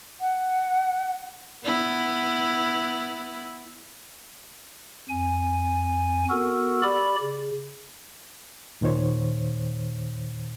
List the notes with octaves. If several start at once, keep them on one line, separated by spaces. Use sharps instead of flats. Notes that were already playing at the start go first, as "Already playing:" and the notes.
F#5
B3 E4
F2 G#5
B3 F#4 A4 A#4
G4 D5 B5
C#3
D#2 A#2 D#3 C5 C#5